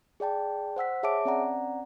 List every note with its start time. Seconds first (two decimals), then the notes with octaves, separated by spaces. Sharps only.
0.20 G#4 D5 G5 A5
0.76 C5 F#5 E6 B6
1.03 G#4 C#5 E5 A5 D6 D7
1.25 C4 C#4 D5 F#5 A#5